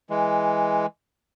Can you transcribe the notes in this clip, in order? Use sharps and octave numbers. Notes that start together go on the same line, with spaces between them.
E3 G#3